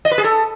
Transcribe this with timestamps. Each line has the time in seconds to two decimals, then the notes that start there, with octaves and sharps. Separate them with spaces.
0.05 D#5
0.11 B4
0.18 G#4
0.24 A4